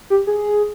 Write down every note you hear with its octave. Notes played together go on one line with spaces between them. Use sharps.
G4
G#4